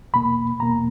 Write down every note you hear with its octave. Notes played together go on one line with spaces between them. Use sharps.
E2 B2 A#3 B5
E2 B2 A#3 A#5